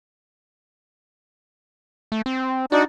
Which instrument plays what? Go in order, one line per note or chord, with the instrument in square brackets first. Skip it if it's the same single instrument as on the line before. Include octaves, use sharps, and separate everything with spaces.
[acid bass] A3
C4
[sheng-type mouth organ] D4 D#4 D5 [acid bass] F#4